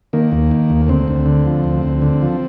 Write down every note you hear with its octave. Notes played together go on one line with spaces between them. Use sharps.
D#3 A#3
D#2
D#3
D#2
D2 C4
D2
D3
F3
D2
D2
D3
F3